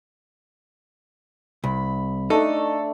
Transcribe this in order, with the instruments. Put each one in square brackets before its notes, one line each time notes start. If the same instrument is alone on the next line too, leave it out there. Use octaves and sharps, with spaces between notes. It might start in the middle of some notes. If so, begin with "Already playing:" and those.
[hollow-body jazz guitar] C2 [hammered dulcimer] B5
[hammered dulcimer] A3 D4 [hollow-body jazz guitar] D#4 [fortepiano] A4